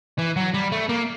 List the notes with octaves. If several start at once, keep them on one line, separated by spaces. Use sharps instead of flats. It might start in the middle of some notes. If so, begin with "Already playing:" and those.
E3
F#3
G3
A3
A#3